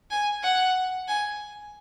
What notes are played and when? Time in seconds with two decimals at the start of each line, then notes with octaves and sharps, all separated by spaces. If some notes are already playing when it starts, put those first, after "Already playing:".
0.11 G#5
0.43 F#5
1.08 G#5